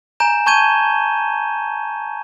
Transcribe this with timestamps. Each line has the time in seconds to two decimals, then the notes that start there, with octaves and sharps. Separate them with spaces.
0.20 G#5 A#5 G6 E7
0.46 A5 C#6 G6 G#6 D#7 G7